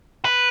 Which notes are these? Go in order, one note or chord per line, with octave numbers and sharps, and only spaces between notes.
B4